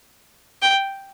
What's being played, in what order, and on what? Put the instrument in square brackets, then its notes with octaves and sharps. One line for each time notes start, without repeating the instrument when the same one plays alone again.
[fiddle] G5